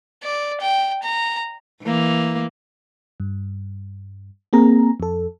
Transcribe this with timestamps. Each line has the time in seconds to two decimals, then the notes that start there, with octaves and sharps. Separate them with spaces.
0.23 D5
0.61 G5
1.03 A#5
1.83 E3 A#3
3.20 G2
4.53 A#3 C4 G#4 A#4 A#5
5.00 F2 A4